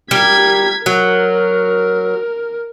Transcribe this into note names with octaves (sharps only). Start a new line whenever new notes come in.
G3 A#4 G#6 B6
F#3 A#4